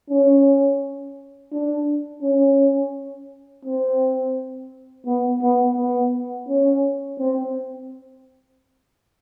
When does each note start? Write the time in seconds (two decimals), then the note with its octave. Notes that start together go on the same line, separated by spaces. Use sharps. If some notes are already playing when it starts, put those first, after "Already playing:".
0.10 C#4
1.52 D4
2.23 C#4
3.65 C4
5.06 B3
5.42 B3
5.77 B3
6.49 C#4
7.19 C4